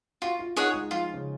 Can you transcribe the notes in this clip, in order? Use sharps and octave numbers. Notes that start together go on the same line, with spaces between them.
F4 F#4
F4
D#4 G#4 C#5 F#5
G#3
F3 F4
C#3